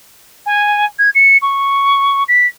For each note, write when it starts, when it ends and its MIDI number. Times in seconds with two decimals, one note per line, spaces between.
0.46 0.85 80
0.98 1.09 92
1.15 1.37 97
1.41 2.23 85
2.28 2.46 95